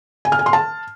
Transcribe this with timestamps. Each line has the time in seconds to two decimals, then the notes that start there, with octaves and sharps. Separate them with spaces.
0.25 G#5
0.32 F6
0.39 G#5
0.46 C6
0.53 A5